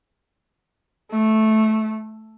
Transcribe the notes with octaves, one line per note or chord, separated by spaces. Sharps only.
A3